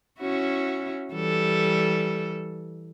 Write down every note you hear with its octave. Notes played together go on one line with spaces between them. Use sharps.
C#4 E4 F#4
E3 G3 A4